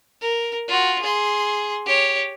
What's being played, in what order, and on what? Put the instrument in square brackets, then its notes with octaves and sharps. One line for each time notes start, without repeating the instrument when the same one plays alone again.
[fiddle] A#4
F4 F#4
G#4 C6
G4 C#5